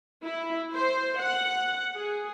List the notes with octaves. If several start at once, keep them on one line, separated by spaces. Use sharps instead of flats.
E4
C5
F#5
G#4